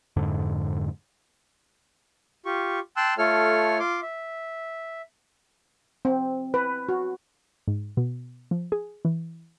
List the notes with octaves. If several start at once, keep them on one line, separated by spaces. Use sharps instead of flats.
F2 G#2 D3
F4 G4 C#6
G5 A5 C6 E6 F#6
A3 F4 A4 C#5 F6
F4 C6 D6
E5
C4
B4
F#4
G#2
B2
F3
G#4
E3